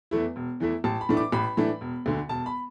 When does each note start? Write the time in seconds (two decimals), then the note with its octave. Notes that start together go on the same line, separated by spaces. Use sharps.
0.11 E2 E3 A3 E4
0.36 E1
0.60 E2 E3 A3 E4
0.84 A1 A5
1.01 B5
1.09 A2 E3 A3 D4
1.17 D6
1.32 A1 B5
1.57 A2 E3 A3 D4
1.81 E1
2.06 D2 D3
2.29 E1 A5
2.46 B5